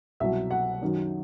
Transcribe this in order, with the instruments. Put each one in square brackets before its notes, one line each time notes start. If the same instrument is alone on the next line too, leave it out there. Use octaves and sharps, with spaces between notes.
[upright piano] C2 B2 F#3 E5
F#5
F#2 D#3 F#3